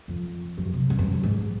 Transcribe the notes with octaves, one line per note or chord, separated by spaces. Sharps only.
F2
F#2
C3
G2
F#2
F#2
G#2